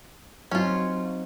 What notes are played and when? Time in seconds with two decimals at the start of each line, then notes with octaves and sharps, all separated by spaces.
0.51 F#3 C4 C#4 D#4 F4